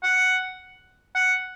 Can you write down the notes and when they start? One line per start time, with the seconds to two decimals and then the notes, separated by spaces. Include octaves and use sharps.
0.03 F#5
1.15 F#5